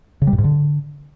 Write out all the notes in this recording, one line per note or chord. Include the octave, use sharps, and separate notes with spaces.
C#3
G3
A2
G#2
D3